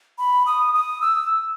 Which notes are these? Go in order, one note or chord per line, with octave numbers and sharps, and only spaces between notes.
B5
D#6
D#6
E6